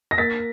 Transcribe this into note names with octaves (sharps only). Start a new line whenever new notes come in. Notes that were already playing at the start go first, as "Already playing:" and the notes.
A#6
A#3 A6 B6